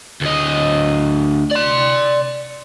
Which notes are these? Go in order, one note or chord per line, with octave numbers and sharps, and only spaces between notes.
D2 D#5
D5 C6